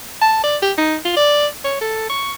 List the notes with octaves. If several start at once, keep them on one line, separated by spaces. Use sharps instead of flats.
A5
D5
G4
D#4
F4
D5
C#5
A4
C#6